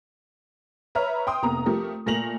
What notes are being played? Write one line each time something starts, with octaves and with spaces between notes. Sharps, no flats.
B4 C#5 E5 A#5 F6
G5 C6 D#6
F1 A#3 B3 A#5
F3 A3 G4 A#4
A#2 A3 A#4 A#6 F7 F#7